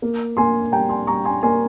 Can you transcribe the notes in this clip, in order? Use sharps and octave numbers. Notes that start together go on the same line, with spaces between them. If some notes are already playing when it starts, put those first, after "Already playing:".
A#3
A#3 G#5 C6
G3 G5 A#5
G#5 C6
G3 A#5 C#6
G#5 C6
A#3 G#5 C6